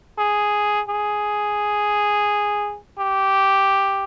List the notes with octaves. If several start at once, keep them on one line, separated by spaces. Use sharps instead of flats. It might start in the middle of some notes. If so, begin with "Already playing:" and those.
G#4
G#4
G4